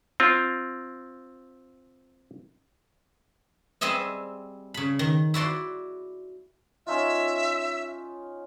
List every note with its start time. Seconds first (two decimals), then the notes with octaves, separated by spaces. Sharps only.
0.20 C4 F4
3.81 G3 C4 G#4 D#5 E5
4.74 C#3 B5
4.99 D#3
5.34 E4 F#4 D5 C6
6.87 C#4 D#4 F4 E5